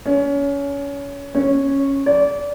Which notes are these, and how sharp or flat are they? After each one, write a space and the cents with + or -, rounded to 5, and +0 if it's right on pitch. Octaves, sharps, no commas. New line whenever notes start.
C#4 +25
C#4 -10
D5 -25